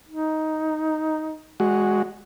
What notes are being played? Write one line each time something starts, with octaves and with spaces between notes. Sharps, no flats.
D#4
G#3 F#4